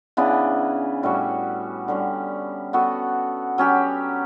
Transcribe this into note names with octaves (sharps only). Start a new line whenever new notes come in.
C#3 E3 B3 D4
A2 G3 C#4 F#4
D3 G3 C#4
B3 F#4 A4
F#3 C#4 G4